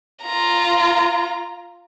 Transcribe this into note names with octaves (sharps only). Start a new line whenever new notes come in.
F4 A#5